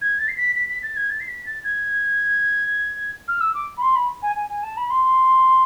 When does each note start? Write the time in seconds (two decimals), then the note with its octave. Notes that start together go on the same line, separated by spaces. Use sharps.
0.02 G#6
0.19 A6
0.28 C7
0.37 B6
0.56 B6
0.69 B6
0.83 A6
0.97 G#6
1.10 A6
1.20 C7
1.28 B6
1.46 A6
1.64 G#6
3.28 F6
3.41 E6
3.54 D6
3.78 B5
3.82 C6
3.96 B5
4.22 G#5
4.36 G#5
4.50 G#5
4.63 A5
4.77 B5
4.90 C6